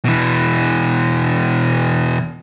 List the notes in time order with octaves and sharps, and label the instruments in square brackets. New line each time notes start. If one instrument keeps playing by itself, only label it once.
[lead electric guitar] B2 E3